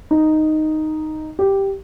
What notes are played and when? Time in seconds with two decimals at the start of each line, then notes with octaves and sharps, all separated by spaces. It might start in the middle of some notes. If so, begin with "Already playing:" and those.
0.11 D#4
1.39 G4